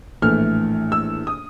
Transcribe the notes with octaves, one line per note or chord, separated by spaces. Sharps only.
A#1 A2 E3 A3 F6
E6
D#6